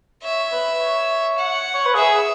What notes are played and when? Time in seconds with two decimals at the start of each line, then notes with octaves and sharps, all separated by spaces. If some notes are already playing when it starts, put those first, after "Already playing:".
0.23 C#5 E5
0.52 B4
0.80 C#5
1.38 F#5
1.74 C#5
1.86 B4
1.95 G#4 E5